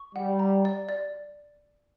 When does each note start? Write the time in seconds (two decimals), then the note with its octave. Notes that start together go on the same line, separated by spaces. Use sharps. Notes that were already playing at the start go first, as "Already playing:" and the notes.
Already playing: C#6
0.15 G3 F#5
0.39 A#5
0.65 D5
0.89 D5